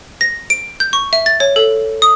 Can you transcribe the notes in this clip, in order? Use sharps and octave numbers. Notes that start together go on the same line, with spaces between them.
A#6
D7
G6
C#6
E5
A6
C#5
A4
D#6